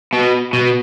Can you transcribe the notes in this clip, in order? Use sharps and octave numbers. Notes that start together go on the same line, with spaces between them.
B2
B2